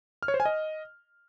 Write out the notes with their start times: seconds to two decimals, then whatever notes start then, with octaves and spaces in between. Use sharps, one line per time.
0.23 F6
0.28 C#5
0.34 C5
0.40 G#5
0.45 D#5